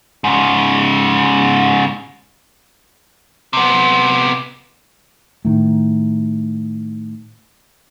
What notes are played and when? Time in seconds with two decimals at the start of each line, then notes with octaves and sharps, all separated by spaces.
0.24 G#2 C#3
3.53 C3 B3
5.45 A2 D#3